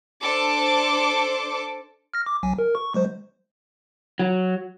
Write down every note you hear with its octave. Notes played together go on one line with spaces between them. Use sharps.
D4 A4 C5 D6
F6 A#6
D6
B1 F#3 G#5
A#4
C#6
F#3 G#3 C5
F#3